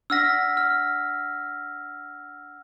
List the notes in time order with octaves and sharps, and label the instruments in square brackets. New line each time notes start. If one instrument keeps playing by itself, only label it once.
[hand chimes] D4 F#5 B6 [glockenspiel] E6 F6 A#6
[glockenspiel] F6